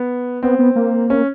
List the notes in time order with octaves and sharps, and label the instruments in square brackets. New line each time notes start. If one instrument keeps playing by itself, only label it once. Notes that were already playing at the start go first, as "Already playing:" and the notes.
Already playing: [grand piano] B3
[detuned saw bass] B3 [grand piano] C4
[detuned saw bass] B3
A#3
[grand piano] C#4